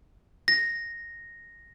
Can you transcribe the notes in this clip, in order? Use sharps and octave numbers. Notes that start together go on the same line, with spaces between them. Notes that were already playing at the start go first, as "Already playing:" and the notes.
A#6